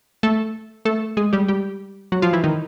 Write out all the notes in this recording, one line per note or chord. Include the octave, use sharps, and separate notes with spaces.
A3 A4
A3 A4
G#3 G#4
G3 G4
G3 G4
F#3 F#4
F3 F4
E3 E4
D#3 D#4